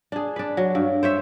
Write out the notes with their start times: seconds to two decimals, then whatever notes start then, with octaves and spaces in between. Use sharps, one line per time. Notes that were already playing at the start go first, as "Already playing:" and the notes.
0.12 D4 G#4
0.36 D4 B4
0.57 F#3
0.75 G2
1.03 C5 C#5 E5